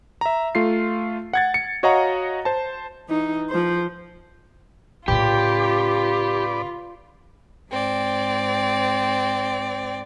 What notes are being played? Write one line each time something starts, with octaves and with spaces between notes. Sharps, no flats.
E5 A#5
A3 F4 C7
F#5 G#6 A6
C#7
F#4 C#5 D#5 F5 F#5 A#5
C5 A5
E3 D#4
F3 C5
A2 C#3 F4 G4 B4 D5
G#2 C4 D5